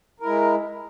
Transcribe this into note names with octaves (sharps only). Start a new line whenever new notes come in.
G#3 E4 A#4